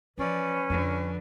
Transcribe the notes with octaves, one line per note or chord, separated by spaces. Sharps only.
E3 F3 C#4 B4 D5
F2 D3 F3